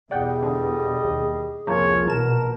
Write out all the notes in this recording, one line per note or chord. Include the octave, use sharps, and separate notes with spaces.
E2 B2 G3 G#4 D5 D#5 F#5 G5
D3
D#2
C2 F2 F3 A#3 C#4 F4 C#5
A#1 B2 E3 A#4 A5 E7